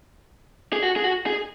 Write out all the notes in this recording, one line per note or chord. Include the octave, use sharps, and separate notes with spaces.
G#4
F#4
G#4
F#4
G#4